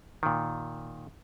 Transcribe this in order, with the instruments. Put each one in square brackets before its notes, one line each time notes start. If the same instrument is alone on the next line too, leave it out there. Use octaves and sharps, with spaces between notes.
[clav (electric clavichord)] A#2 D#3